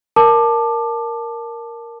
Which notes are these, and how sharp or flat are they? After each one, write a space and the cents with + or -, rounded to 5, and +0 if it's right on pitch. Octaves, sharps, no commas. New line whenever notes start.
A#4 +0 A5 +0 D6 +25